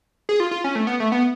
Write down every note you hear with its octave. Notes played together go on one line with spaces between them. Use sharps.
G#4
F4
F4
C#4
A3
B3
A3
B3